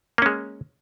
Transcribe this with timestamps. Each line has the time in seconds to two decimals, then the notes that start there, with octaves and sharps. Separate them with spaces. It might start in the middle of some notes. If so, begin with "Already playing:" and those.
0.18 A#3
0.22 C#4
0.26 G#3